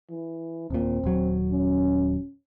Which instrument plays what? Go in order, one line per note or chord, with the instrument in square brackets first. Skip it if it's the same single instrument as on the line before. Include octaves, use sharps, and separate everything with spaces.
[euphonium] E3
[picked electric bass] D#1 A#2 [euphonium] C4
[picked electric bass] D#1 F#3
[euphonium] C#4